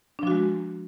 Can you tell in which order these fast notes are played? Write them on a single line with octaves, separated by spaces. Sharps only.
D4 F3 F#4 G#3